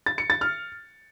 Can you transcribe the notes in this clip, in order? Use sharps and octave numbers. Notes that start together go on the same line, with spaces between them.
A6
C#7
A6
F6